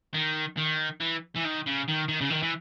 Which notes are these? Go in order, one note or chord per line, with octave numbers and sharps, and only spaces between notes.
D#3
D#3
E3
E3
D#3
C#3
D#3
D#3
C#3
D#3
E3